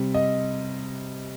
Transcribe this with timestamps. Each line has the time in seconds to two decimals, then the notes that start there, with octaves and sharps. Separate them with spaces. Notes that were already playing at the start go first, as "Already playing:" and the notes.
Already playing: C3 G3
0.14 D#5